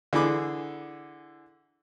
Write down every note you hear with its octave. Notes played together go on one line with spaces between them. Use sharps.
D3 E3 G#4 B5 D6